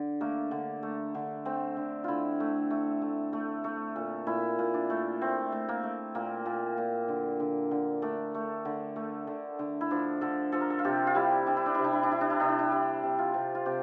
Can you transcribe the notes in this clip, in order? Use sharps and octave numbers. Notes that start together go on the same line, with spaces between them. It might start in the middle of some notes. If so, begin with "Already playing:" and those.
Already playing: D3
A3 A#3
D3
A3
D3
A3 C4
D3
D3 E4 F4
A3
A3
A3
A3
A3
A#2
A#2 E4
A#2
D4
A3
A3 C4
A3
A#3
A3
A#2 A#3
A#2
A#2
D3
D3
D3
A3 D4
A3
D3
A3
D3
D3
E4
F3 D4
D3 A4
F3 A4
A#4
A4
F4
C3 G4
F4
G3 E4
G3 D4
E4
D4
C3 E4
D4
E4
D4
G3 E4
D4
E4
C3 D4
E4
D4
G3 E4
C3
F4
C3
F4
C3 G4